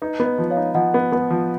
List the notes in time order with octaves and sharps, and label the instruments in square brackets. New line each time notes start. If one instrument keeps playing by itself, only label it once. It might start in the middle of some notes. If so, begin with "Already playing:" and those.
[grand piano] D#4 [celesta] B4 D#5
[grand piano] B3
[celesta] B4 D#5
[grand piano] F3
[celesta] C#5 F5
[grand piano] D#4
[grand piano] F3 [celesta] D#5 F#5
[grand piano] B3
B3
F3